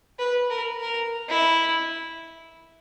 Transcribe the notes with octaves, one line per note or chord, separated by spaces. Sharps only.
B4
A#4
A#4
E4